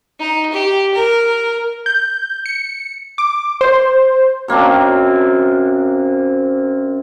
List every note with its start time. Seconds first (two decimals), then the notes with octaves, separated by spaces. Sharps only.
0.19 D#4
0.53 G4
0.94 A#4
1.86 G6
2.46 C#7
3.18 D6
3.61 C5
4.48 F#2 A#3 C4 D4